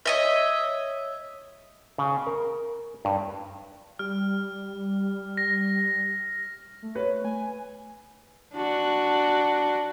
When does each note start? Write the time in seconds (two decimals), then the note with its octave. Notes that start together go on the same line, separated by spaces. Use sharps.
0.06 C#5 D#5 E5
1.98 C#3
2.27 A#4
3.05 G2
3.99 G3 F6
5.37 A#6
6.82 A3
6.95 B4 C#5
7.25 G#5
8.54 D4 F#4